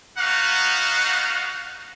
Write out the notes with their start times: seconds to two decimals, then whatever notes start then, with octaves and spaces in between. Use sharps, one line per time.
0.18 B3 D#4 F#4 F5 F#5